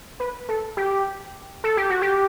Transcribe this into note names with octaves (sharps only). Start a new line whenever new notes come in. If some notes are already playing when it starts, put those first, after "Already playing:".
B4
A4
G4
A4
G4
F#4
G4